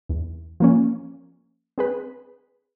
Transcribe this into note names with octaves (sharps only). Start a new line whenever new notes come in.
E2
F3 A#3 C#4
C4 G#4 B4